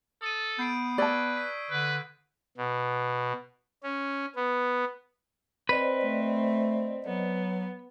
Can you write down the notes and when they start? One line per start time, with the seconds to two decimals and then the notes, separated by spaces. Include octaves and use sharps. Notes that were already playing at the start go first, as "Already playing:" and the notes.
0.22 A4 D#6 D#7
0.59 B3 G6 C7 D7
0.98 B4 D5 A5 C#6 E6 G#6
1.37 B6
1.70 D3 B4
2.58 B2
3.83 C#4
4.36 B3
5.69 C4 B4 C5 D5 D#5
6.04 A3
7.06 F#3 B3